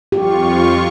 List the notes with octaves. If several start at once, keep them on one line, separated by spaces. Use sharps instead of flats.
F2 F4 G4 C#6